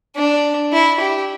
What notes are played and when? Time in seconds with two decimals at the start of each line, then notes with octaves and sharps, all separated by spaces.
0.16 D4
0.73 E4
1.00 G4